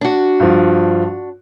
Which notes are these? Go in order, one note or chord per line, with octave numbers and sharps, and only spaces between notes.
D4 F#4
G2 F3